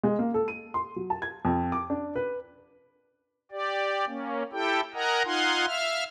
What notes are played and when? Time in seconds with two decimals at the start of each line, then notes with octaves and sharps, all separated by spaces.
0.04 G#3
0.19 A#3
0.34 A4
0.48 D#7
0.74 C6
0.96 F#3
1.10 A5
1.22 G#6
1.45 F2
1.72 D6
1.90 D4
2.16 B4
3.51 G4 D5
4.07 A#3 C#4
4.52 E4 G4 A4 G5
4.94 A#4 D#5 F#5 G#5 A#5
5.25 D#4 F4 F5 F#5 G#5 C6
5.67 E5 F5 F6